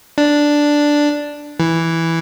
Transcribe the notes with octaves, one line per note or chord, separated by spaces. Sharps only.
D4
E3